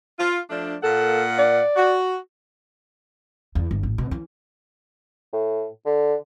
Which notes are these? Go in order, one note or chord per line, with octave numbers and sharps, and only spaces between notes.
F4
F3 A3 D4
A#2 A#3 A4 F#5
D5
F#4
E2
G1
A1
B2
E3 C#4
A2
D3